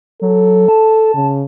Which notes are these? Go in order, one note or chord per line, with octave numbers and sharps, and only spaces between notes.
F#3 A4
A5
C#3